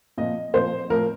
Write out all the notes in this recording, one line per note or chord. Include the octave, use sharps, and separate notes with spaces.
A#2 F3 D#5
A#2 F3 C5
A2 F3 A#4